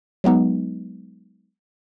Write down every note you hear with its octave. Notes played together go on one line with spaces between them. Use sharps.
F#3 G#3 B3 D#4